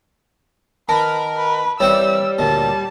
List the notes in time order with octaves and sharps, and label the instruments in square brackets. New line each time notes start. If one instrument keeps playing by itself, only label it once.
[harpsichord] D#3 [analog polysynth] A#4 [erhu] B4 [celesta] A5
[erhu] B4
[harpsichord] E3 C4 C#6 [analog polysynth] G3 [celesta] C#5 [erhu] E6
[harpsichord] D2 A#2 [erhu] A5